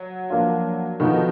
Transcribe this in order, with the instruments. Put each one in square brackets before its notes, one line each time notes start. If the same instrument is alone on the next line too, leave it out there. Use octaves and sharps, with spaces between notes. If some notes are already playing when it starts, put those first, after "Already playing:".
Already playing: [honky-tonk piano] F#3
[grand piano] F3 A#3 D4 F4
[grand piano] D3 F3 B3 D#4 F#4 [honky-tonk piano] D#3